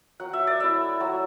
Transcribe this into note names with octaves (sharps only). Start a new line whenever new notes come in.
F#3 F#5
E5
D5
A3 E4 E5
F#3